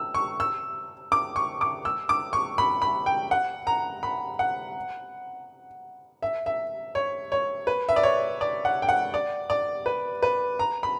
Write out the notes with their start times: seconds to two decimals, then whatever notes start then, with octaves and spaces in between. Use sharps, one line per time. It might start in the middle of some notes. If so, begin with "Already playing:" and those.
Already playing: E6
0.15 C#6
0.40 E6
1.12 D6
1.36 C#6
1.61 D6
1.85 E6
2.09 D6
2.33 C#6
2.58 B5
2.82 B5
3.06 G5
3.31 F#5
3.67 A#5
4.03 B5
4.39 F#5
6.22 E5
6.46 E5
6.95 C#5
7.32 C#5
7.67 B4
7.89 E5
7.96 D5
8.03 C#5
8.41 D5
8.65 F#5
8.82 G5
8.89 F#5
9.14 D5
9.50 D5
9.86 B4
10.22 B4
10.59 A#5
10.83 B5